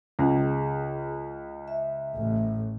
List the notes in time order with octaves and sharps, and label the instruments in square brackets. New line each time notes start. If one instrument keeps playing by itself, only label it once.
[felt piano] C#2 [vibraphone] G#4
[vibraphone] E5
[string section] A1